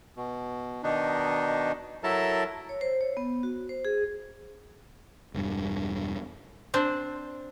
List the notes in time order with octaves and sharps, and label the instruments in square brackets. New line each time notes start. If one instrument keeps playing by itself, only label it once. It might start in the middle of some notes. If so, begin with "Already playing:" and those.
[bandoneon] B2
B2 D#3 D4 D#4
F#3 E4 A4 A#4 A5
[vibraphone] C#5
C5
C#5
B3
F#4
C5
G#4
[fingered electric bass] E1 G2
[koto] C4 D4 C5